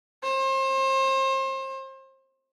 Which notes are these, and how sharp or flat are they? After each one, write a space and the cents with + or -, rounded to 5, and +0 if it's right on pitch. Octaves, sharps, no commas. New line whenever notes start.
C5 +35